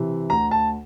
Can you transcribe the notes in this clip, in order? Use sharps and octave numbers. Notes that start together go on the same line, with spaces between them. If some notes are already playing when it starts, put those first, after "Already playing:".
Already playing: C3 E3
D2 A#5
A5